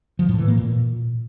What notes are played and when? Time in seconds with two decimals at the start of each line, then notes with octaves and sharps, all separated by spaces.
0.19 F3
0.29 A2
0.38 E3
0.48 A#3
0.58 A#2